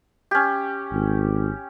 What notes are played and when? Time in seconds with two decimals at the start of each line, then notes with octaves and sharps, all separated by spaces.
0.31 C#4 G4
0.92 G#1